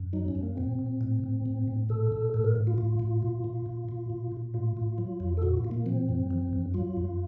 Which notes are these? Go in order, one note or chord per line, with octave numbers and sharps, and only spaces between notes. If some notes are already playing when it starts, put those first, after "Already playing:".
Already playing: F#2
F#3 D#4
C#4
F#2
A#3
A#2 C4
A#2
A2
A2
A2
A2
A#2 A4
A#2
A2 A4
A#4
A2
F4
A2 F4
A2
A#2
A#2
A#2
A#2
A#2
A#2
A2 F4
A2
F#3
F2
A4
A#2 F#4
F4
A#2
A#3
F3 C4
F#2
F3
F#2
F#3 F4
F#2